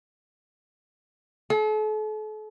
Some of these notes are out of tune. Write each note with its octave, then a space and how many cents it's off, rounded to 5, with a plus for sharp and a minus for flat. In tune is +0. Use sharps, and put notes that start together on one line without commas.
A4 -40